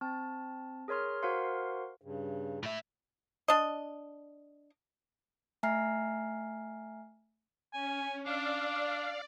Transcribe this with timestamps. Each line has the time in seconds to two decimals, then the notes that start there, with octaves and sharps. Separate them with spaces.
0.01 C4 A5
0.88 G#4 A#4 C#5 C6 F6
1.22 F#4 A#4 C5 F5 F#5 C6
2.01 G2 C#3
2.63 A2 E5
3.48 D4 D#5
5.63 A3 E5 G#5 A#5 F6 C7
7.73 C#4 G#5
8.26 D4 D5 F5